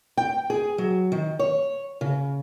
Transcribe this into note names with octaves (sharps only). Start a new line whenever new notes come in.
G5
G#4
F#3
D#3
C#5
C#3